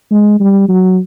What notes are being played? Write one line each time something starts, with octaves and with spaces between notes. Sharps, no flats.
G#3
G3
F#3